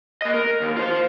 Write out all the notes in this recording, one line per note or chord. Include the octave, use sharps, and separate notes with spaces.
A#3 D#5
A#4
D#2
F4 C5